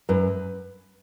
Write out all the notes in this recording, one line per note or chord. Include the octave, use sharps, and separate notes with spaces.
F#2 B4